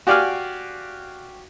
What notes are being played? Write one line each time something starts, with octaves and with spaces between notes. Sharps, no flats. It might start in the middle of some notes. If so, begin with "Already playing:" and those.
F#4 G4 D5 F5 G#5 F6